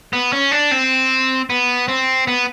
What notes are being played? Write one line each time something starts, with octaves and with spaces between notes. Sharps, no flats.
B3
C#4
D4
C4
B3
C4
B3